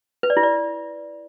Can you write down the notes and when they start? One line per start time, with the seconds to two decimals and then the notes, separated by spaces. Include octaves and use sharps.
0.23 B4
0.30 D5
0.37 E4
0.43 D5